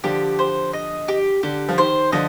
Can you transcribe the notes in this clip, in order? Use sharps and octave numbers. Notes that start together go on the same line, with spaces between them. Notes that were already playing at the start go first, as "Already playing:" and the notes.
D3 F3 G4
C5
D#5
G4
D3 G4
F3
D#3 C5
D3 F3 D#5